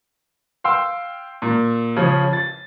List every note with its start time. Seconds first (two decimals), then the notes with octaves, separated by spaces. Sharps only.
0.64 F5 G5 C6 E6
1.42 A#2
1.96 C#3 F3 C#4
2.33 A6